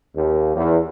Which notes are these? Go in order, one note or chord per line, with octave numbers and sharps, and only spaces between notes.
D#2
E2